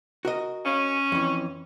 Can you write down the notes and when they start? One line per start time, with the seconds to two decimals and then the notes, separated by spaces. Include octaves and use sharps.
0.25 F#4 A#4 D#5
0.65 C#4
1.12 F2 E3